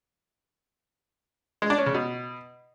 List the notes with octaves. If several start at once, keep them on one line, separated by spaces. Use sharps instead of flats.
G#3
D4
C#4
C#3
B2